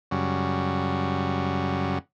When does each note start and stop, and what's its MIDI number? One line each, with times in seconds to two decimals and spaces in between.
0.11 1.98 42
0.11 1.98 49
0.11 1.98 55
0.11 1.98 66